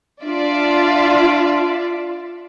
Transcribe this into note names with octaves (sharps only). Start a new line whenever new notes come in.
D4 F4 D5 E5